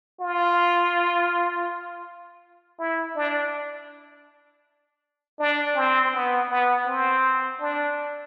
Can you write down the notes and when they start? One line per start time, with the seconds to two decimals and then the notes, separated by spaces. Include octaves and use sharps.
0.20 F4
2.79 E4
3.16 D4
5.39 D4
5.76 C4
6.13 B3
6.50 B3
6.87 C4
7.61 D4